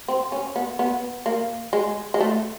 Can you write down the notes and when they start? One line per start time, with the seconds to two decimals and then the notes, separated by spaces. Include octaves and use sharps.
0.08 C4
0.32 C#4
0.56 B3
0.79 B3
1.26 A#3
1.73 G#3
2.14 G#3
2.21 A3